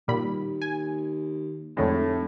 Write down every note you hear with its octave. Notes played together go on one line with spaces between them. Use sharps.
D#2 A#2 G3 B5
G#5
F1 F2 A2 D3 G#3